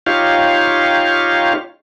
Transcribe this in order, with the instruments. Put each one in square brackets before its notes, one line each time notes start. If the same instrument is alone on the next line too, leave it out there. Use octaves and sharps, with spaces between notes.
[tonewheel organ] D#4 F4 G4 C#5 F5